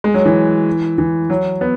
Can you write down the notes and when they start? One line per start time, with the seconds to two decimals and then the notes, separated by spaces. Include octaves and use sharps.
0.04 G#3
0.14 F#3
0.25 E3
0.98 E3
1.30 F#3
1.61 B3